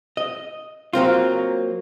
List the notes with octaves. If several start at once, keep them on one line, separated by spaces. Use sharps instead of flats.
D#5
F#3 A#3 C4 F4